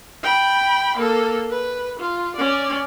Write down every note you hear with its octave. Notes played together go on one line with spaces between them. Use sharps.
G5 B5
A#3 A4
B4
F4
C#4 D5